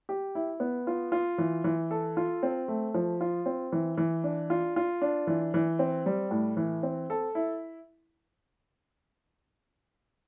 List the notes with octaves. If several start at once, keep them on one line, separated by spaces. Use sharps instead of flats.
G4
E4
B3
F4
F4
E3
E3
A4
F4
C4
A3
F3
F4
C4
E3
E3
D4
F4
F4
D4
E3
E3
C4
G3
A2
E3
C4
A4
E4